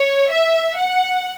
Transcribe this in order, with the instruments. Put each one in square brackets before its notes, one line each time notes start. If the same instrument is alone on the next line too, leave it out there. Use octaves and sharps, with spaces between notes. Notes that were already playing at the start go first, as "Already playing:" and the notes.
Already playing: [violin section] C#5
E5
F#5